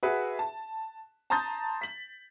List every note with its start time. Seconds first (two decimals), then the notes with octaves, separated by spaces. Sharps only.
0.03 F#4 G#4 B4 E5
0.39 A5
1.30 A5 A#5 C6 D#6 G6 A6
1.81 B6 F#7